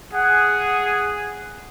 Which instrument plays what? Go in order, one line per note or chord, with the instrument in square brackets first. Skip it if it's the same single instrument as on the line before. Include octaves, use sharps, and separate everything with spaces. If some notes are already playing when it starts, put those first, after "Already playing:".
[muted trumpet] G#4 [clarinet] F#5